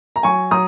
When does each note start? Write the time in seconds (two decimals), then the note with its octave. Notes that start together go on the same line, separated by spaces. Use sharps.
0.16 A#5
0.23 F#3 G#5 C#6
0.51 F#3 A#5 D#6